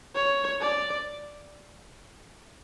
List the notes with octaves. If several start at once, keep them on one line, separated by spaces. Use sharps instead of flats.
C#5
D5